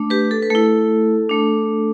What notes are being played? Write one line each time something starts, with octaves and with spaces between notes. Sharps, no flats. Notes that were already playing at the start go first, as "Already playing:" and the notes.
Already playing: A3 D4
G4 B4
A4
B4
A3 E4 A4
A3 D4